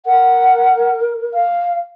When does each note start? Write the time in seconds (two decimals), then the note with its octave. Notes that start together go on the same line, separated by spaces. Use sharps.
0.06 A#4 F#5
1.34 F5